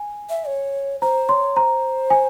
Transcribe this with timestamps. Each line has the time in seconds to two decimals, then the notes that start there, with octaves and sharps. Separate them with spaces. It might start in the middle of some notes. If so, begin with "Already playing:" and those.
Already playing: G#5
0.29 E5
0.47 C#5
1.01 C5 A#5
1.29 C#5 C6
1.56 C5 A#5
2.10 G#5